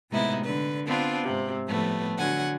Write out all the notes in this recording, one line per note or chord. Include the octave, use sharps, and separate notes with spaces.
A2 C3 G#3 B3 D#4 E4
D3 B4
B3 C4 D4 F4
G#2 C3
A2 F3 G3 A3 B3
D3 F#3 F#5 G#5